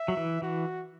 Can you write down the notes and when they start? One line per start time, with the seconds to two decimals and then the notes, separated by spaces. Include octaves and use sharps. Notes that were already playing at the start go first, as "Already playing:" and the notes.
Already playing: E5
0.08 F#3
0.17 E3
0.42 E3 F#4